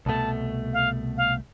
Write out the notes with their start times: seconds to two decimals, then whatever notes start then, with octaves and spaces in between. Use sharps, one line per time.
0.06 C2 B2 A3 A5
0.73 F5
1.17 F5